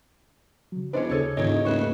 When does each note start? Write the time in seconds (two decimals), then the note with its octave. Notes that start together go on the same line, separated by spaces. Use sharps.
0.72 C#3 F#3
0.93 E1 C#4 D4 B4 C5 D#5
1.09 D#2 C#3 G#4 A4 C#5 G#6
1.37 E1 G#2 D#3 C#5 D#5
1.65 D#1 A3 B4 C#6